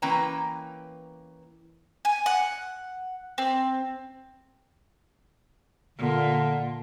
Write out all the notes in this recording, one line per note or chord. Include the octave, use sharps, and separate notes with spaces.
E3 A#3 C#4 B4 G5 A#5
G#5
F#5
C4
A#2 D3